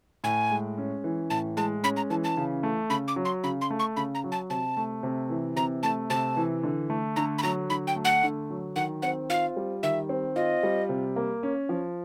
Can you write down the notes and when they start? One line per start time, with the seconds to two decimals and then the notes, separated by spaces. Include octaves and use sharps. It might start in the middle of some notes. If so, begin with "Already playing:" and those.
0.24 A2 G#5
0.51 G#3
0.78 C#4
1.04 E3
1.30 A2 A5
1.57 G#3 A5
1.83 C#4 B5
1.97 A#5
2.10 E3 A5
2.24 A5
2.37 C#3
2.63 A3
2.90 C#3 B5
3.08 D6
3.16 F#3
3.25 C6
3.44 C#3 B5
3.61 C6
3.70 A3
3.79 C#6
3.97 C#3 B5
4.15 A#5
4.24 F#3
4.32 A5
4.50 C3 A5
4.77 A3
5.03 C3
5.30 E3
5.56 C3 A#5
5.83 A3 A5
6.10 C3 A5
6.37 E3
6.63 D3
6.90 A3
7.16 D3 A#5
7.38 B5
7.43 F#3 A#5
7.70 D3 B5
7.87 G5
7.96 A3
8.05 F#5
8.23 D3
8.50 F#3
8.76 D#3 F#5
9.02 C4 F#5
9.30 F4 F5
9.56 G3
9.83 D#3 E5
10.09 C4
10.36 F4 D#5
10.63 G3
10.89 C3
11.16 A#3
11.43 C#4
11.69 F3